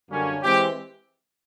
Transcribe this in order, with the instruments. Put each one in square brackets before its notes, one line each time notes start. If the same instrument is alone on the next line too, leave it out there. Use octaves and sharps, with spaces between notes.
[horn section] F#2 D3 G3 A#3 C#4
E3 G#3 C4 G4